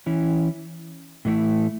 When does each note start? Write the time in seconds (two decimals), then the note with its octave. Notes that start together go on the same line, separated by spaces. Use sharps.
0.06 E3 C#4 E4
1.25 A2 E3 A3 E4